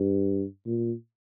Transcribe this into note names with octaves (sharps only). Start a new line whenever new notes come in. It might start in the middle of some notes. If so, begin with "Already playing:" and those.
Already playing: G2
A#2